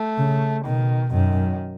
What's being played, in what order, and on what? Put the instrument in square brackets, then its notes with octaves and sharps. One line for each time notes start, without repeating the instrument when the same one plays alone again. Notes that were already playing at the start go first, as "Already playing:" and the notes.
Already playing: [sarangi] A3
[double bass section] C#3
[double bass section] B2 [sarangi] D#3
[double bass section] F#2 [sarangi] D#3